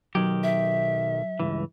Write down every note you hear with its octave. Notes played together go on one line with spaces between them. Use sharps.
B1 D#3 F#3 G4
E5
C#2 G2 E3